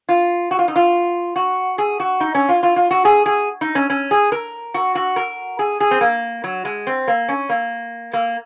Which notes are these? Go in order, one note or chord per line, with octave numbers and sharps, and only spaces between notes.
F4
F#4
F4
D#4
F4
F#4
G#4
F#4
D#4
C#4
F4
F4
F4
F#4
G#4
G#4
D#4
C#4
C#4
G#4
A#4
F#4
F#4
A#4
G#4
G#4
C4
A#3
F#3
G#3
C4
A#3
C#4
A#3
A#3